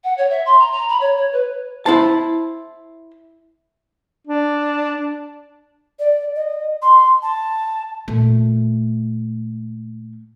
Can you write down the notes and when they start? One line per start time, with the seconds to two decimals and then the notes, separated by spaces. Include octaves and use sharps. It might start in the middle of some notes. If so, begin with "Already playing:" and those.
0.03 F#5
0.17 C#5
0.29 E5
0.45 C6
0.59 A#5
0.72 A#5
0.88 B5
1.00 C#5
1.16 C#5
1.32 B4
1.86 E4 C5 A5
4.27 D4
5.99 D5
6.36 D#5
6.82 C6
7.22 A5
8.08 A#2 A3